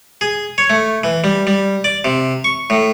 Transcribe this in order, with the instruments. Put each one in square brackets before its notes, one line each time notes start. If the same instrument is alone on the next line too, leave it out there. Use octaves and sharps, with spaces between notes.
[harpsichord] G#4
C#5
A3
E3
G3
G3
D5
C3
C#6
A2